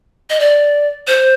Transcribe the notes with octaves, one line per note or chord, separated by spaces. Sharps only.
D#5
D5
C5